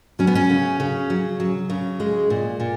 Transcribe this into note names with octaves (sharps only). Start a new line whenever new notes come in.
F#3 C#4
B3
C#4
C#3
C#3
F#3
F#3
C#3
G#3
A#2
A#2